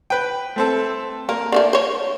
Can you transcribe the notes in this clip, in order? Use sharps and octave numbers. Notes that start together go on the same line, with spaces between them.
B4 G5
A3 C4 A4
A#3 A#4
D3 F#3 A3
C5 C#5